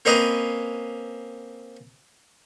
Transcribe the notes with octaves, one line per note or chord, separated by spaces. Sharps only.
A#3 C4 C#4 B4 D#5 A#5